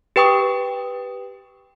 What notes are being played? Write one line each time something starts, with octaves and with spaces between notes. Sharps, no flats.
G4 B4 G5 C#6 D#6